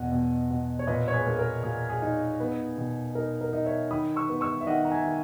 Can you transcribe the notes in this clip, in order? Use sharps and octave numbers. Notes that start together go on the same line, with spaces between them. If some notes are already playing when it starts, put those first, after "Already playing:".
Already playing: E2 B2 D#5 F#5
B2
B2
C#5
A#2 B4 D#5
C#5
G#4 B4
A#3 G#4
A#4
A#2 G#4
G#4
D#4
B3
B2
D#4 A#4
A#4
D#4 D#5
C#5 E5
D#3 B5 D#6
C#6 E6
B3
C#6 E6
E5
D#3 D#5 F#5
A#5
E5 G#5
D#3